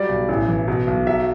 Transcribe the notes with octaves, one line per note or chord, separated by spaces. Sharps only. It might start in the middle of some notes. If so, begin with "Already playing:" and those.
Already playing: F#3 G3 D5
B1
A1
E3
B2
B1
F#3 E5